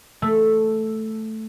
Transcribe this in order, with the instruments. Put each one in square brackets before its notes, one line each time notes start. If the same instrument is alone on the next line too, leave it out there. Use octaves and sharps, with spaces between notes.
[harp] A3